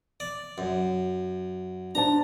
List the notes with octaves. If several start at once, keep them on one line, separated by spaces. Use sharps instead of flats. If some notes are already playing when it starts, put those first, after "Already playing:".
D5
F#2
D4 C5 A5 A#5